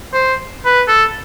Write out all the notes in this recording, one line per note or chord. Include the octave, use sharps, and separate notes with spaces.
C5
B4
A4